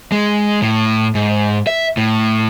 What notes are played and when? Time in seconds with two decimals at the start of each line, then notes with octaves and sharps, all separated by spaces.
0.12 G#3
0.62 A2
1.15 G#2
1.67 E5
1.97 A2